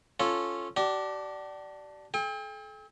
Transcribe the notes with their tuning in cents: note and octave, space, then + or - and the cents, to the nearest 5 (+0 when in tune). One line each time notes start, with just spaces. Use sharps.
C#4 -5 F4 +0 A4 +0
D4 +0 G4 -45
A4 -40 G5 +40